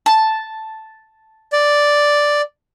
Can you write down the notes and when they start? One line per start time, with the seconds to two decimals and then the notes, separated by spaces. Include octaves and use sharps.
0.06 A5
1.53 D5